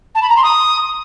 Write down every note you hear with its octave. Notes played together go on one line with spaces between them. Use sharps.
A5
B5
A#5
C6
D#6